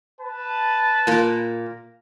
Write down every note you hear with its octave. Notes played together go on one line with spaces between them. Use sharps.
B4 A5
A#2 A#3